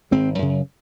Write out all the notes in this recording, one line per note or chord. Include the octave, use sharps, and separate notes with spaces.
G#1 G#3 C4
F#2 C#3